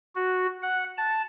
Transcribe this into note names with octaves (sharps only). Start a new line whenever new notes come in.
F#4
F#5
A5